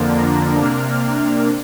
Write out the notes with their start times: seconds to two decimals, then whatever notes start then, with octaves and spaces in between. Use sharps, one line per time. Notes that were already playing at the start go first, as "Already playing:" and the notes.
Already playing: F2 D3 F3 A#3 D4
0.15 A#5
0.60 C3 A#3 D4 F6